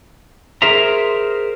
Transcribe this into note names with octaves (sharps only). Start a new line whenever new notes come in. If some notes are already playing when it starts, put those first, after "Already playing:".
G#4 A#4 C5 E5 A#5